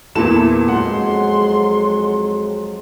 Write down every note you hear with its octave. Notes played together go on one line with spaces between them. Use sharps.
E2 A#2 E4 A4 E7
F2 F#3 G#3 F#5 C6